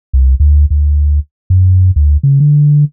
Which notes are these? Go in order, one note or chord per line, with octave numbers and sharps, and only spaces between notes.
C2
D2
D2
F#2
D2
C#3
D3